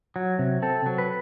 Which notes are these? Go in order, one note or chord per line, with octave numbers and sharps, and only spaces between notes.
F#3
C3
C4 A4
F#3
B4